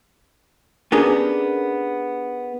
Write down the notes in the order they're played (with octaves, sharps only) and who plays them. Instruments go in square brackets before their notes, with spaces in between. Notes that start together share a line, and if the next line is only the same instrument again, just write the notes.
[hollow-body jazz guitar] B3 C#4 D4 G4 G#4 A#4